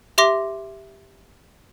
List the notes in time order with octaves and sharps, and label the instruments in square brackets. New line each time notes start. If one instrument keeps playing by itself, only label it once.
[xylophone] G4 E5 C6 D6 A#6